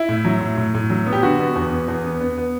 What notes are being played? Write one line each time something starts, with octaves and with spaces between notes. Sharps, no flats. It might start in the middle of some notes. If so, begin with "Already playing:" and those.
Already playing: E4
A2
F#3
A2
A2
A2
F#3
B3
G4
D3 F#4
B3
E2
B3
E2
B3
B3
B3